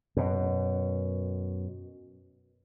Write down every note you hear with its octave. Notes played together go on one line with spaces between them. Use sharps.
F#2 B2